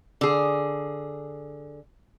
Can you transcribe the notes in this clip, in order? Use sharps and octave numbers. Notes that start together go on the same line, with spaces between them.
D3 G#4